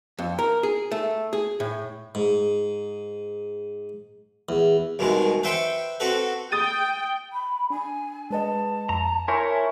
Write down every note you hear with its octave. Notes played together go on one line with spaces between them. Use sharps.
F2
A#4
G#4
A3
G#4
A2
G#2
E2
C2 B2 D#3 G#3
B4 C5 E5 G5 C6 C#6
C4 F#4 A4 B4
G5 D#6 A6 D#7
B5
D4 G#5
G#3 B4 D#5 A5
F2 A#5
E4 A#4 C#5 G#5 C6 G6